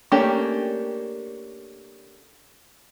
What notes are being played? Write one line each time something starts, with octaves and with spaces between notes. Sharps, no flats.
A3 A#3 C#4 D4 G4